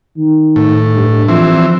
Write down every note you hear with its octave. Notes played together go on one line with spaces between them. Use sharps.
D#3
A2
G2
E3 F3 C4